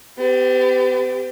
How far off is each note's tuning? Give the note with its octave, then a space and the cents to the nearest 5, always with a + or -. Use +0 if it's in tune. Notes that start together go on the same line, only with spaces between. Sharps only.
B3 +45 G4 +0